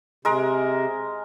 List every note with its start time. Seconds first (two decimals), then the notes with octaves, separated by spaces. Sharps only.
0.25 C3 G#3 A#4